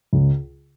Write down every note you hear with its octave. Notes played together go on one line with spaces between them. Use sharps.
C#2